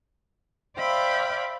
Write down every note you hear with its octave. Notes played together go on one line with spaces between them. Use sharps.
C5 D5 E5 F5 G5 B5